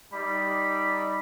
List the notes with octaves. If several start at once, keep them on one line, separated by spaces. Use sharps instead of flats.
G3 D#4 D5 B5